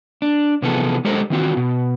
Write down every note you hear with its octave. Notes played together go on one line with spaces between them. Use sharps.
D4
C3 E3 F3 B3 G#4 A4
G#3 G4 A4 A#4 C5 D#5
D#3 E3 C4 F4 F#4
B2